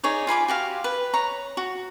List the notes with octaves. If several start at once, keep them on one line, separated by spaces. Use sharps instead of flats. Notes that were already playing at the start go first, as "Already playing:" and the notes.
D#4 G#4 C#5 D5
F4 G#5 B5 D6
F#4 G4 F5
B4
C#5 A#5
F#4